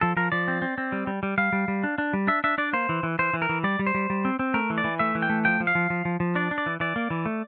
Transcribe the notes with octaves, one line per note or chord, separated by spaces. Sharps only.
F3 A4
F3 A#4
F3 D5
C4
C4
C4
G3
G3
G3
G3 F5
G3
G3
D4
D4
G3
D4 E5
D4 E5
D4 D5
A#3 C5
E3
E3
E3 C5
E3
A#4
E3
G3 D5
G3
C5
G3
G3
C4
C4
A3 A#4
E3
D5
E3
A3 E5
E3
G5
A3
F3 G5
F3
F5
F3
F3
F3
F3
D4 D5
D4
D5
E3
E3 D5
A#3
E3
A3